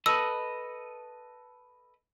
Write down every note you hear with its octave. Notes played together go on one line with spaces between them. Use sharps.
A4 B4 D#5 E6